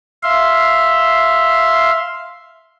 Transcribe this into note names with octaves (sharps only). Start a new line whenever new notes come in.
E5 F5 C6